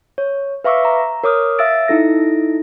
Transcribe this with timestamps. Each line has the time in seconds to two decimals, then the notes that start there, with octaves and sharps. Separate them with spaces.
0.18 C#5
0.64 B4 E5 F5 C#6 D6 E6
0.85 A#5
1.24 A#4 C#5 D6 D#6 F6
1.59 E5 F5 E6 A6 D7
1.88 D#4 E4 A4 A#6